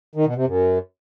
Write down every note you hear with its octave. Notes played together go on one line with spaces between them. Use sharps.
D#3
B2
C3
F#2